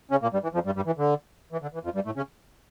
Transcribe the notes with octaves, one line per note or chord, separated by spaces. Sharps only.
C#3 C#4
A#2 A#3
G2 G3
E3
F2 F3
G2 G3
G2 G3
E3
D3
E3
D3
E3
F2 F3
G2 G3
A2 A3
C#3 C#4